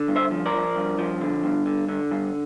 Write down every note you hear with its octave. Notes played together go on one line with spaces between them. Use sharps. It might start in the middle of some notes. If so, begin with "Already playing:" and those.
Already playing: D3
G2
C5 E5
F3
A#4 D5
F3
G2
F3
D3
G2
D3
D3
G2